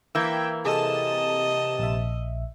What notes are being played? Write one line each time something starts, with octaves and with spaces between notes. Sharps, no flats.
E3 A#3 E5 G5 E6 G6 G#6
C3 G#4 A4 D#5 A5 E7
A#1 E5